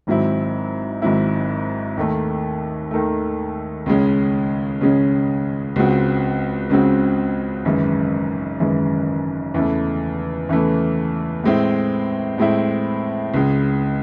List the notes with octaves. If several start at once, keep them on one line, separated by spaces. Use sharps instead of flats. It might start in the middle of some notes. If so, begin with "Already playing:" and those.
G#1 G#2 F#3 C4 E4
G#1 G#2 F#3 C4 E4
D#2 D#3 A3
D#2 D#3 A3
C#2 C#3 G#3 C#4
C#2 C#3 G#3 C#4
C#2 C#3 G#3 C4 F#4
C#2 C#3 G#3 C4 F#4
G#1 F#2 E3 G#3
G#1 F#2 E3 G#3
E2 C#3 E3 A3
E2 C#3 E3 A3
A2 G#3 C4 E4
A2 G#3 C4 E4
C#2 C#3 G#3